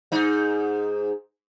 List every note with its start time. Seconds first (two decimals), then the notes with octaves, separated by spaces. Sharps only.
0.12 G#2 D#4